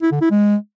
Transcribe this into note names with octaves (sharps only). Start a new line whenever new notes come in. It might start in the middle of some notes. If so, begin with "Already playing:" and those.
E4
D3
E4
G#3